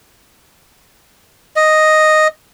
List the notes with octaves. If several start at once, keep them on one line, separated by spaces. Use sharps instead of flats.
D#5